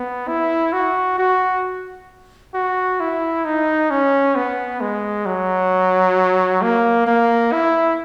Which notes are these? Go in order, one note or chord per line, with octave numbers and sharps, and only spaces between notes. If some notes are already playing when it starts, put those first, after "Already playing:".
Already playing: B3
E4
F#4
F#4
F#4
E4
D#4
C#4
B3
G#3
F#3
A#3
A#3
E4